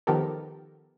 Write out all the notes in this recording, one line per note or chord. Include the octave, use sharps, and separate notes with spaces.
D#3 F3 B3 G4 A4 A#4